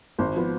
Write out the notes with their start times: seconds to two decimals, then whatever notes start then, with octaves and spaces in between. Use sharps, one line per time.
0.18 G#1 C5
0.37 F3 B3